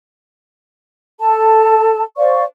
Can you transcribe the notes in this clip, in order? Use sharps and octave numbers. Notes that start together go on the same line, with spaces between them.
A4 A5
C5 D5 F5 C#6